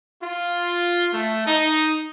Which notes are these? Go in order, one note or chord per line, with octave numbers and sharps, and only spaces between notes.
F4
A3
D#4